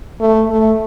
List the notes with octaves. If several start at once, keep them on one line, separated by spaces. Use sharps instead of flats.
A3
A3